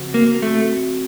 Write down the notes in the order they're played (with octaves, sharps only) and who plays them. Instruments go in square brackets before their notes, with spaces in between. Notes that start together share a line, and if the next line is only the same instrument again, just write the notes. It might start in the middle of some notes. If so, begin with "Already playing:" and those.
Already playing: [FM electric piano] C#3 F3 C4 F#4
[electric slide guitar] A#3
A3